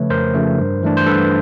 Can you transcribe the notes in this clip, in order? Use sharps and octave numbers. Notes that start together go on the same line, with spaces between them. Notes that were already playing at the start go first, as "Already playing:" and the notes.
Already playing: C#3 F3 A3 B4 C#5
F2 A#4 C5
C#3 F3 A3
G2
E3 A3 D4
C5
G2 A4 B4